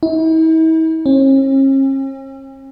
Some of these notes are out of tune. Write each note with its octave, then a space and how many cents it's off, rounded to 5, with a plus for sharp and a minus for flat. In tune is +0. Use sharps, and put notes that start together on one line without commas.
E4 -45
C#4 -45